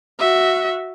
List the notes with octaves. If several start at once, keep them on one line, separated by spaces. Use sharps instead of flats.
F#4 E5